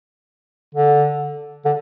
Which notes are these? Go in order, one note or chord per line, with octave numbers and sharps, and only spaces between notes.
D3
D3